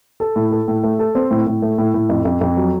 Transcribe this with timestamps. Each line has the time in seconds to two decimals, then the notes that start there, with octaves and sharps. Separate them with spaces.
0.20 A4
0.36 A2
0.51 A4
0.68 A2
0.83 A3
0.99 A4
1.15 C4
1.31 A2
1.46 A2
1.62 A3
1.78 A2
1.94 A2
2.09 F2
2.25 F2
2.41 F2
2.57 F#3